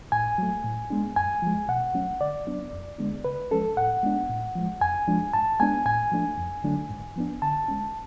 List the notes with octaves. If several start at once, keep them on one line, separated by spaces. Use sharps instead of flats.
A2 G#5
F#3 A3
A2
G#3 B3 D4
F#2 G#5
F3 G#3
B2 F#5
F#3 A3 C#4
D3 D5
F#3 B3 D4
F2
D3 G#3 B3 D4
C#3 B4
F3 G#3 C#4 A4
A2 F#5
G#3 B3 D4
A2
F3 G#3
F2 G#5
F3 G#3 D4
G#2 A5
G#3 B3 D4 G#5
A2 G#5
F3 A3 D4
F2
D3 F#3 A3 D4
G#2
F3 B3 D4
D3 A5
G#3 C#4